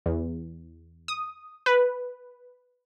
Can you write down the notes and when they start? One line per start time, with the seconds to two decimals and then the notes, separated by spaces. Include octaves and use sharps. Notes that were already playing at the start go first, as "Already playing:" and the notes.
0.06 E2
1.08 D#6
1.66 B4